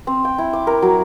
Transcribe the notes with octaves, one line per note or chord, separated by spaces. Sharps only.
C4
G5
E4
D6
A#4
F#3